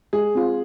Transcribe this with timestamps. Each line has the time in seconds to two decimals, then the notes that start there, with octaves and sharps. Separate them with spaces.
0.13 G#3 G#4
0.35 C4 F4